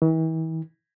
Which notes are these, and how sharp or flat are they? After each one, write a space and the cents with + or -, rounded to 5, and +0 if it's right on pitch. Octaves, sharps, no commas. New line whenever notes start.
E3 -40